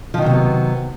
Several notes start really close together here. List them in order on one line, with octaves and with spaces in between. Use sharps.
F3 D#3 F#3 C3 B3